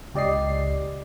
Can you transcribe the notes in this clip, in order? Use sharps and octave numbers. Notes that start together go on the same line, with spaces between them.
C#2 G4 D5 D#5 C7